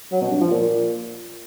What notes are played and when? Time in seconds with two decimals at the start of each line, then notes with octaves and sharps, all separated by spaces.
0.12 F#3
0.21 B2
0.31 G2
0.41 F3
0.51 A#2